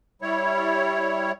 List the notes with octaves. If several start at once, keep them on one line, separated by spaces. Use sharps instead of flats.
G3 E4 C#5